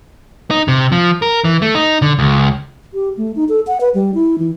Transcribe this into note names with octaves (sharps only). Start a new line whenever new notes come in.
D#4
C3
F3
A#4
E3
A3
D#4
D3
C#2
G4
A3
D#4
A4
F#5
B4
G3
E4
E3